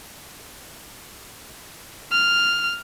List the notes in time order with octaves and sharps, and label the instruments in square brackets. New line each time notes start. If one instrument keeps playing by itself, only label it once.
[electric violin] F6